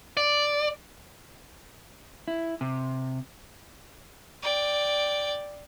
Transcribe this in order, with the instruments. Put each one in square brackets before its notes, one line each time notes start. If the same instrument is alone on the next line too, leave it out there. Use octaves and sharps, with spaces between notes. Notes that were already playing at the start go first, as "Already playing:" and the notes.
[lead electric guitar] D5
[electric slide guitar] E4
C3
[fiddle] D5 G5